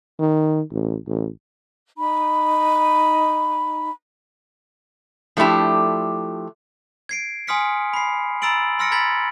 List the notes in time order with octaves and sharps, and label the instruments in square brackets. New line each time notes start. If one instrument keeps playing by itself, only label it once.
[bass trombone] D#3
A1
A1
[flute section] D#4 B5
[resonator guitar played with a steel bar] F3 A3 D4 E4 G4
[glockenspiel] G#6 C7 D7
G#5 C6 D#6 F6 B6 C#7
B5 C7
A#5 B5 E6 A6 D7 F#7
C6 E6 F6 A#6 C#7 D7
A#5 B5 G#6 A6 B6 F#7